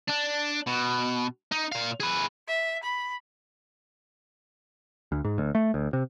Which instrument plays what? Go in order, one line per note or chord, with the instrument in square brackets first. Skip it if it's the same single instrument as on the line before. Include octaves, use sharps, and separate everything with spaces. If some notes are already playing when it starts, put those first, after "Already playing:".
[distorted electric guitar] D4
B2
D#4
A#2 F5
G#4 B4
[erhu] E5
B5
[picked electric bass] D2
G#2
D2
A3
D2
C3